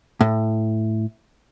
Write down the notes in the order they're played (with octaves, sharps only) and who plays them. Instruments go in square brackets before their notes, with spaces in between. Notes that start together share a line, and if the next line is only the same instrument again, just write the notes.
[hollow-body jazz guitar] A2